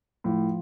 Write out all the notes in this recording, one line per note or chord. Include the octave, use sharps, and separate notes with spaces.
A2 F3